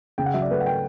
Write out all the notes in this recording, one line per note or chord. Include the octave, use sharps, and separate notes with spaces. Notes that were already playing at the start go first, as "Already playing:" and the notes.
C#3 G5
F#5
F#3 E5
D5
A3 B4
F#5
G5